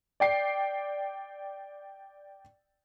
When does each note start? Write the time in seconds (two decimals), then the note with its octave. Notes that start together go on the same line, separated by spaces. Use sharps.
0.20 D5 G5 C7